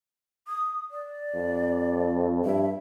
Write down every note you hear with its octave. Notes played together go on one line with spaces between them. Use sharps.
D#6
D5
F2
G2 E5